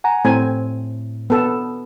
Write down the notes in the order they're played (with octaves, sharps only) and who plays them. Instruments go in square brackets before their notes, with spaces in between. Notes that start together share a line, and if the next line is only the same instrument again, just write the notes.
[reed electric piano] F#5 G#5 A#5
[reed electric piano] A2 [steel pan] C4 G#5
[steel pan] B3 A4